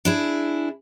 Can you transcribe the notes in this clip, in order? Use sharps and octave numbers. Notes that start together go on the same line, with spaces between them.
D4 E4 G#4